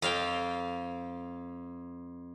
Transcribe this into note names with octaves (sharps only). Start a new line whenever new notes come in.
F2 F5 G5